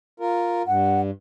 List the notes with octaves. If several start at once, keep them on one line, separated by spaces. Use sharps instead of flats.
F4 A#4
G2 F#5